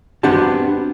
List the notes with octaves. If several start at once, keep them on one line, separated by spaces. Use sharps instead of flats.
B3 C4 D4 F#4 G4 A5